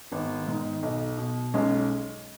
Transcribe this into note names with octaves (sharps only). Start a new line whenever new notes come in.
G#1 B3
G#2 D#3
B1
B2
B1 G#3 C#4